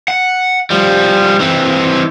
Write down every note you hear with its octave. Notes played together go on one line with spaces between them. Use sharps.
F#5
F3 G3
E3 C4